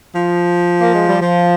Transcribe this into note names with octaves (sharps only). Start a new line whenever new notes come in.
F3
A#3
G#3
G3
F3